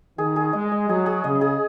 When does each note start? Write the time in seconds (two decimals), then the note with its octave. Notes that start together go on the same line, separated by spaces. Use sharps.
0.18 D#3 G#4
0.36 G#4
0.53 G#3 D#5
0.72 D#5
0.89 F#3 G#4
1.06 G#4
1.24 C#3 D#5
1.41 G#4